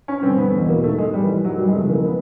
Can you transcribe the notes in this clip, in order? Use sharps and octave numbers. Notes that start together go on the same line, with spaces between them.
C#4
G2 D3 C4
B3
E2
B2
A#3
G#2 D#3 A3
G#3
A2 E3 G3
G2 D#3 F#3
G3
G#3
F2 C#3 E3 A3
A#3
B3